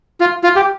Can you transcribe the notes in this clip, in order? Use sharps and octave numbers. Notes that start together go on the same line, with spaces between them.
F4
F4
G4